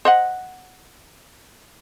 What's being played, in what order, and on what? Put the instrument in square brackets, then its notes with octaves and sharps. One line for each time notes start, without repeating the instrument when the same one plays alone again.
[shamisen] C5 D#5 F#5